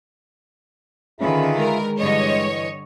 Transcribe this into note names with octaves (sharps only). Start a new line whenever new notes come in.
D3 D#3 C#4 F4 G#4 B4 E5
G#3 A#4
G2 D3 E3 C#5 D#5